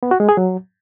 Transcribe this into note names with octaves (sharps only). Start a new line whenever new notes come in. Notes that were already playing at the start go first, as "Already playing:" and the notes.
B3
F#4
G#3
G#4
F#3